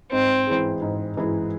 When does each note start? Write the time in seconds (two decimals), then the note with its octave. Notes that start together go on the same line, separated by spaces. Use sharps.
0.11 G#2 C4
0.47 E3 G#3 E4 G#4
0.82 G#2
1.17 E3 G#3 E4 G#4